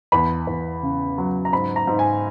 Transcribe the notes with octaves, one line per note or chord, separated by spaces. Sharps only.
E2 B5
E2
C#3
F#3
A#5
G#2 B5
A#5
G#2
G#5